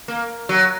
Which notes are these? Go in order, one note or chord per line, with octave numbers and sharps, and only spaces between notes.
A#3
F#3